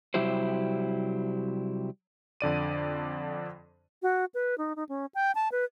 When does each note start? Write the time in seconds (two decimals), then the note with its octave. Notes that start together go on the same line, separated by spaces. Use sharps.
0.14 C3 F#3 G3 E4 G4 C5
2.41 F2 D3 D5 D#7
4.02 F#4
4.34 B4
4.58 D#4
4.76 D#4
4.89 C#4
5.14 G5
5.35 A5
5.52 B4